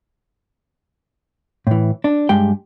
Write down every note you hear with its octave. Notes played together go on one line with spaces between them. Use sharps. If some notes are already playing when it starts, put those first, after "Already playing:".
A2 E3
D4
G2 G#3 G4 G5